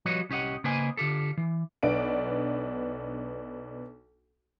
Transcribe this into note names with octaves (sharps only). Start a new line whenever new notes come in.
F3 G3 F#4 B4 C#5 D#5
C2 C#4 G4 D#5 F#5
C#3 A#3 B4 C5 D#5 G#5
D3 F4 G4 A4
E3
B1 B3 D4 D7